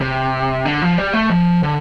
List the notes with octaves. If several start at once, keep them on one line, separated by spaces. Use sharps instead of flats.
C3
D3
F3
G3
A3
F3
D3